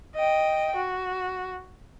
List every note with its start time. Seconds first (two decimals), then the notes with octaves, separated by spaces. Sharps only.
0.16 D#5 G5
0.76 F#4